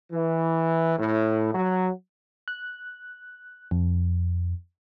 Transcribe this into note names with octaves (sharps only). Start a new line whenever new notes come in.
E3
A2
F#3
F#6
F2